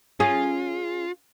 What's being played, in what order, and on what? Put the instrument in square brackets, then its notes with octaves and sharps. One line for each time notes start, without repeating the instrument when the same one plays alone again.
[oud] C#4 G#4 [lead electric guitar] F4